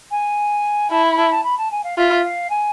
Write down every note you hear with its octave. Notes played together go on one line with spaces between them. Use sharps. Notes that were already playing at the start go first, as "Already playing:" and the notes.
G#5
E4 A5
B5
A5
A5
B5
A5
G#5
F5
F4 E5
F5
G#5